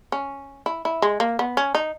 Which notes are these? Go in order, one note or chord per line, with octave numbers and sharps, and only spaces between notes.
C#4
E4
E4
G#3
A#3
B3
C#4
D#4